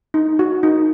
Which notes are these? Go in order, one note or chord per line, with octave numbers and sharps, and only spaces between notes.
D#4
F#4
D#4